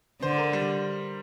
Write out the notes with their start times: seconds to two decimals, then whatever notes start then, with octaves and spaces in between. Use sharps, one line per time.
0.22 D3 C5
0.38 A#4
0.53 G3